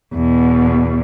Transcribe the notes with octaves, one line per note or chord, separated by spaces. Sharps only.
E2 B2